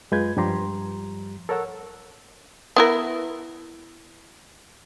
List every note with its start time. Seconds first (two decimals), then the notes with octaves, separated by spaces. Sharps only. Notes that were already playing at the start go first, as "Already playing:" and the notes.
0.12 F#2 G#3 F4 B4 G6 G#6
0.37 G2 F3 G3 G4 A#5 C6
1.49 A4 A#4 C#5 F#5 E6
2.76 B3 E4 A#4